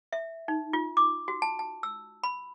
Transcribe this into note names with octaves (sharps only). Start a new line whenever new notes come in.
E5
D#4
F4
D6
F#4
A5
A5
E6
B5